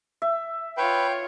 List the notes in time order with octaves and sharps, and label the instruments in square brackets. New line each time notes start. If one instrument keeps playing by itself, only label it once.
[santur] E5
[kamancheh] F4 C#5 [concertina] B4 [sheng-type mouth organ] G5